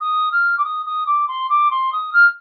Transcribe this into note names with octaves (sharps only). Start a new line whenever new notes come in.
D#6
F6
D6
D#6
D#6
D6
C6
D6
C6
D#6
F6